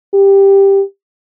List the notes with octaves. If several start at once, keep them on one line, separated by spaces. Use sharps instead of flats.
G4